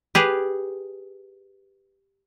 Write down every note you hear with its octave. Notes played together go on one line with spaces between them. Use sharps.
G4 G#4 B4